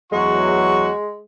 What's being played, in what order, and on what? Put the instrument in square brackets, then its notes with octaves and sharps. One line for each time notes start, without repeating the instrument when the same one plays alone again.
[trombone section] E2 F#3 [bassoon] G#3 [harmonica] F#4 C#6